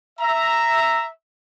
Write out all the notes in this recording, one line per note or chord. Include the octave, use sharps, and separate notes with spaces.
E5 A#5